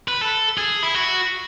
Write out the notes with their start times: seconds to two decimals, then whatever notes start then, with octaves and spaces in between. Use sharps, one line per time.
0.08 B4
0.21 A4
0.58 G#4
0.83 E4
0.94 F#4